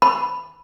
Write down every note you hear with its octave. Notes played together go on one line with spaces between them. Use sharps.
B5